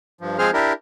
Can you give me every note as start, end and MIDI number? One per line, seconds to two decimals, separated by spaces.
0.21 0.39 43
0.21 0.39 53
0.39 0.50 53
0.39 0.50 56
0.39 0.50 60
0.39 0.50 68
0.39 0.50 72
0.39 0.50 89
0.54 0.73 62
0.54 0.73 64
0.54 0.73 67
0.54 0.73 70